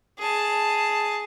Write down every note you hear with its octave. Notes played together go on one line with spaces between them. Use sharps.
G#4 A5